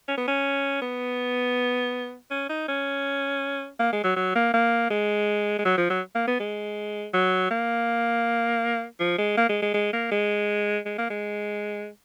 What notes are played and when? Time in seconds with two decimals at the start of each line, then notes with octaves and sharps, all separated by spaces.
0.08 C#4
0.18 B3
0.28 C#4
0.82 B3
2.31 C#4
2.50 D#4
2.68 C#4
3.79 A#3
3.92 G#3
4.04 F#3
4.16 F#3
4.35 A#3
4.54 A#3
4.90 G#3
5.59 G#3
5.65 F#3
5.77 F3
5.90 F#3
6.15 A#3
6.27 B3
6.40 G#3
7.14 F#3
7.51 A#3
9.00 F3
9.18 G#3
9.37 A#3
9.49 G#3
9.62 G#3
9.74 G#3
9.93 A#3
10.12 G#3
10.85 G#3
10.98 A#3
11.10 G#3